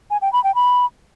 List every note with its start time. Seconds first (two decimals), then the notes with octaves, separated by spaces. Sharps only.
0.11 G#5
0.22 G5
0.33 B5
0.44 G5
0.55 B5